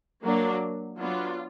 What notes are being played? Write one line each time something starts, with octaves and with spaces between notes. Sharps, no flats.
F#3 A#3 D4
F#3 B3 D4 F4